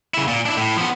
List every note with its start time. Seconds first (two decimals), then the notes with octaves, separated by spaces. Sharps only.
0.14 C#3 E4
0.28 A#2
0.46 D4 E4
0.57 A2
0.77 F3 B3